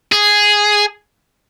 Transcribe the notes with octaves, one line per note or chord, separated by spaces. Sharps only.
G#4